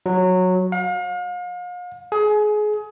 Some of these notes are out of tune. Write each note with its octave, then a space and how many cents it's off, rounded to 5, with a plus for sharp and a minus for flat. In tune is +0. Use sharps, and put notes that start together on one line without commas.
F#3 -10
F5 +40
G#4 +25